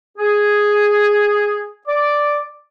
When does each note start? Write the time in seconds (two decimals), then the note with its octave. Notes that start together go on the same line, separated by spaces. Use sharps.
0.18 G#4
1.87 D5 D6